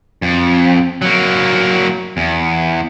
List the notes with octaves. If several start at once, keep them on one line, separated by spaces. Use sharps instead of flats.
F2
F#3 A#3
E2